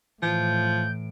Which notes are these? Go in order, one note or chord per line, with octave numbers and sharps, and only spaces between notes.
A2 E3 F3 G6 D7